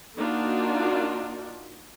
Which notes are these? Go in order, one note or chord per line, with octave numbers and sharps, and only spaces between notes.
A#3 D4 D#4 F4 F#4